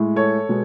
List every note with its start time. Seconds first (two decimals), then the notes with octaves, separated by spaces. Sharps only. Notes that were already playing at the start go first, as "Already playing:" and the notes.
Already playing: A2 G#3
0.16 A4 C#5
0.49 B2 G#3